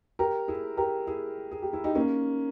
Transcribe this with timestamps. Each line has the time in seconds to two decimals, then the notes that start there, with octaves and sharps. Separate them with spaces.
0.19 G4 A#4
0.48 E4 G#4
0.77 G4 A#4
1.07 E4 G#4
1.51 G#4
1.62 G4
1.73 E4
1.84 D#4 G4
1.95 A#3 C#4